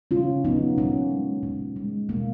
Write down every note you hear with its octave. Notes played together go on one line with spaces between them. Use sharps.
C#3 C#4 F4
F#3 A#3 B3 D#4
A#2 A#3 C#4
G#3
A#2
G#3
B2 A#3